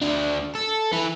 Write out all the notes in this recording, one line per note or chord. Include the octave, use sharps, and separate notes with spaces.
D2 D4
A4
E4 B4